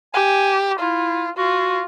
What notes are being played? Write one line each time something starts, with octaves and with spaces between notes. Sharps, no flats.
G4 G#5
E4 F4
F4 F#4